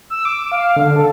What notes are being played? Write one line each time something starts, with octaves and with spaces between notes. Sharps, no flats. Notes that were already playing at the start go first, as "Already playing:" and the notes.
E6
D6
F5
D3
A4